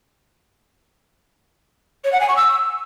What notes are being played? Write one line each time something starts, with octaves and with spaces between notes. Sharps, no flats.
C#5
F#5
G#5
C#6
E6